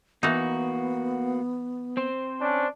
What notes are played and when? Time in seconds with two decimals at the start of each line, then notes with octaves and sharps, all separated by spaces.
0.23 E3 A#3 B3 D#4 F#4
1.97 C4 C5
2.41 C#4 D4